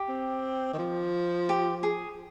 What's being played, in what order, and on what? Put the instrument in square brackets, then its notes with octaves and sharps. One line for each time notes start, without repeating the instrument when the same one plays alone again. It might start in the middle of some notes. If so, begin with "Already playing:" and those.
Already playing: [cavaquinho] G4
[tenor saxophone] C4
D#3
F3
[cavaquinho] G4
G#4